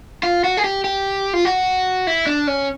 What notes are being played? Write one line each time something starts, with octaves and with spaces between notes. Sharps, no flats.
F4
F#4
G#4
G4
G4
F4
F#4
E4
D4
C#4